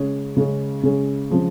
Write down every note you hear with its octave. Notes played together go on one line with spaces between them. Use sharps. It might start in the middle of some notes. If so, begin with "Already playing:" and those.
Already playing: C#3 G#3 C#4 G#4
C#3 G#3 C#4 G#4
C#3 G#3 C#4 G#4
C#3 F3 G#3